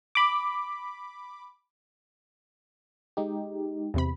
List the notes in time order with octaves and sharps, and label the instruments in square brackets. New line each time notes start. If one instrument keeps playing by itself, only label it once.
[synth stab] B5 D6
[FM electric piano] G#3 D#4 G4
[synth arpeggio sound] E2 C3 B5